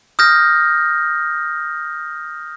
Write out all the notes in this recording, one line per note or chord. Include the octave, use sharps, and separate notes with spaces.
D#6 F6 G6 A#6